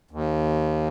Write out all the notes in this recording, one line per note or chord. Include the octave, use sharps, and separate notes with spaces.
D#2